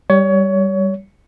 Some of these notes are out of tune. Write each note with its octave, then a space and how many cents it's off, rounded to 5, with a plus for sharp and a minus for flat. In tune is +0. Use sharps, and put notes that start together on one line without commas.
G3 +0 C#5 +25